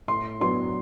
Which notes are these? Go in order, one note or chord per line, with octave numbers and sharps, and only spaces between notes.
A2 C6
F#3 B3 D4 C6